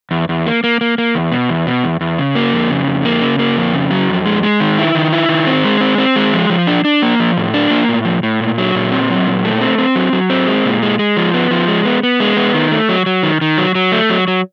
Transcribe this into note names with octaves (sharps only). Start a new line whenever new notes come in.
E2
E2
A#3
A#3
A#3
A#3
E2
B2
E2
B2
E2
E2
C#3
A#3
F2
C#3
F2
A#3
C#3
A#3
F2
C#3
F#3
F2
G#3
G#3
D#3
E4
D#3
E4
D#3
C4
G#3
C4
C4
G#3
F3
F3
D4
D4
A#3
F3
A2
D4
A#3
A2
F3
A2
A#2
F#3
A#2
C4
F#3
A#2
A3
C4
C4
F#3
F#3
C4
G#3
A#2
G#3
G#3
F3
B3
F3
G#3
B3
B3
G#3
B3
D#3
A3
F#3
F#3
D#3
D#3
F#3
F#3
A3
F#3
F#3